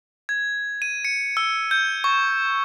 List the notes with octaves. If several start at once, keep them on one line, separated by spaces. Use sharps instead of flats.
G#6
D#7
C#7
E6
G6
C#6